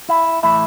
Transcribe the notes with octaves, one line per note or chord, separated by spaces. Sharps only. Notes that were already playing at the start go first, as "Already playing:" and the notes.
E4
A2 E3 A3 E4